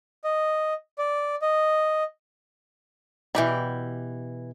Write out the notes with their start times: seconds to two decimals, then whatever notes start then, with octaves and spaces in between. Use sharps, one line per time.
0.24 D#5
0.98 D5
1.42 D#5
3.35 B2 D#3 E3 G4 D5